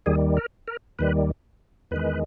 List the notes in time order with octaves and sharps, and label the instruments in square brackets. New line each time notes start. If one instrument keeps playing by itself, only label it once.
[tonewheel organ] D#2 D#3 G3 G#4
A#4
A#4
D#2 D#3 G3 B4
E2 D#3 G#3 B4